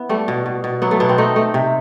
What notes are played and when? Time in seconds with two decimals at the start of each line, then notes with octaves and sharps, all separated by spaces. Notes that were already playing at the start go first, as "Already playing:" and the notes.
Already playing: B3 E4
0.09 G3 A3
0.28 B2
0.46 B2
0.64 B2
0.82 F#3 B3
0.91 A3
1.00 B2 B3
1.09 C4
1.18 A3 D#4
1.36 A3
1.54 C3